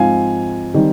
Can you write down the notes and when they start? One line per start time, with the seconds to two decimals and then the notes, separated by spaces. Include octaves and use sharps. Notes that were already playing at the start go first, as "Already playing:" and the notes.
Already playing: G#2 F3 C4 F5 G#5
0.74 D#3 G3 C4